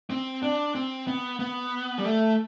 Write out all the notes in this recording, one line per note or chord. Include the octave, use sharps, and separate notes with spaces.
C4
D4
C4
B3
B3
G3
A3